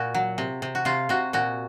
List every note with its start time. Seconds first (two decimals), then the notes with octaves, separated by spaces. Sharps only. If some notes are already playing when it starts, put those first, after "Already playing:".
Already playing: A#2 F#4
0.14 F#3
0.38 C3
0.62 C3
0.75 F#4
0.85 C3 F4
1.09 C3 F#4
1.33 A#2 F#4